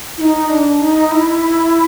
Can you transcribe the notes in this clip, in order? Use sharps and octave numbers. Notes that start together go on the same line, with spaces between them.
E4
D#4
D4
D#4
E4